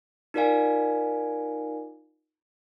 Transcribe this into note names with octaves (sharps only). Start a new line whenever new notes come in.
D#4 F4 A#4 D5 F5 G#5